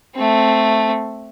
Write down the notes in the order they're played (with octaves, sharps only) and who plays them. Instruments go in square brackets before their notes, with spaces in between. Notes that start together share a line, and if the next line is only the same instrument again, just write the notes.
[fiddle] A3 C4